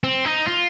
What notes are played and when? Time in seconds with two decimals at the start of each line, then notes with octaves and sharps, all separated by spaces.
0.04 C4
0.25 D#4
0.47 F4